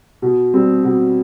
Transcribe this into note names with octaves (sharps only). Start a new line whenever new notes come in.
B2
G3 C4
B2